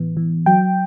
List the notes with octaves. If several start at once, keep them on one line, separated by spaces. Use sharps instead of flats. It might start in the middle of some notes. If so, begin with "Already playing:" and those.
Already playing: A2 E3 B3
E3
F#3 G5